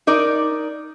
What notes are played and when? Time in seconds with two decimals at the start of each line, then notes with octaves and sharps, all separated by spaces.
0.07 D#4 A#4 D5